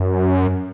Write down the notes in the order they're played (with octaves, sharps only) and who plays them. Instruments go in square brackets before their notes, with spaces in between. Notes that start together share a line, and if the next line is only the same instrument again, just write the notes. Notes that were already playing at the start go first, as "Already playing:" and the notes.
Already playing: [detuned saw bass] F#2